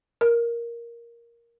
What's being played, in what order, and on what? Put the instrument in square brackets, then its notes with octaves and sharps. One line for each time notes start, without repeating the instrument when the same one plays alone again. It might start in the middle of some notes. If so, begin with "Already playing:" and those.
[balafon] A#4